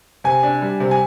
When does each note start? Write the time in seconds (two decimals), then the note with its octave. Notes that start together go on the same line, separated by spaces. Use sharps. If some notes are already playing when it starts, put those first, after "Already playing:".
0.24 C3 G#5
0.43 D4
0.62 G3
0.80 C3
0.91 G#5